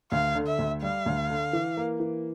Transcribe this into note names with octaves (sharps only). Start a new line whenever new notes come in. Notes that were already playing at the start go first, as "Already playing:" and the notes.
D2 F5
D3
E5
D2
G3 F5
D2
D3
E3
A#3
E3